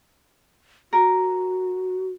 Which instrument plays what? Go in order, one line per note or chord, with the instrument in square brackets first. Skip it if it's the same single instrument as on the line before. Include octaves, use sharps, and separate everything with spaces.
[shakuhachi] F#4 [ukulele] A#4